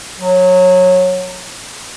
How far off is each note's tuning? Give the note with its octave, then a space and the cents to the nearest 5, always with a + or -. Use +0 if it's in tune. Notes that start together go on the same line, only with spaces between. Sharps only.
F#3 -20